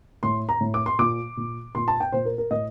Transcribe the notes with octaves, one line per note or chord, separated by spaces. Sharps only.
A2 C6
A#5
A2
D6
C6
A#2 D6
A#2
A#2 C6
A5
G5
A#2 C5
A#4
A#4
A2 D#5